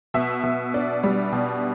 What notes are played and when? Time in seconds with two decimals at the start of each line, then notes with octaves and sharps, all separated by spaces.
0.14 B2 E5
0.43 B2
0.74 D4
1.03 G3
1.33 B2